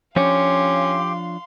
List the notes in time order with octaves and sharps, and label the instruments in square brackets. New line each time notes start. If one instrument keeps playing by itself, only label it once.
[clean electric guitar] F3 D4 C#5 [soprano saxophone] C#4 [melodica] G4 [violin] F5 C6